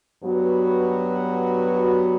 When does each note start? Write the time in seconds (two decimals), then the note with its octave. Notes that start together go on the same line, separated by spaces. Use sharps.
0.23 G2 F#3 B3 F#4 B4